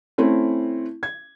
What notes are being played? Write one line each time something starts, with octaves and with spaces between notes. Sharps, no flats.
A3 C4 C#4 E4
G#6